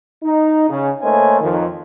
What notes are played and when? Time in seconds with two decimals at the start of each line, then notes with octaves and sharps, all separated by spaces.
0.24 D#4
0.70 C#3
1.02 A3 A#3 C5 C#5 D#5 G#5
1.41 F2 D#3